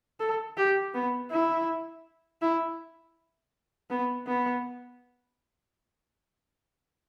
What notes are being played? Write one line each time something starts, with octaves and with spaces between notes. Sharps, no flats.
A4
G4
B3
E4
E4
B3
B3